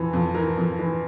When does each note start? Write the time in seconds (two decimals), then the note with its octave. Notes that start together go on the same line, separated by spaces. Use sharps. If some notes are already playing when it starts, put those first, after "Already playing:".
Already playing: F2 E3
0.13 F2
0.34 E3 A#4
0.58 F2
0.79 E3